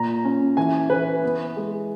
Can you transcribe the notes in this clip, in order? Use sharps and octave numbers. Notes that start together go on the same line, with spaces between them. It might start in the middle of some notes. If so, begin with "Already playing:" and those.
Already playing: A#2 A#5
C#4
E3 G#5
E3 B4
B3
G#3